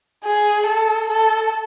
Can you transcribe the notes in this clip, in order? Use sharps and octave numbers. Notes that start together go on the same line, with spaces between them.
G#4
A4
A4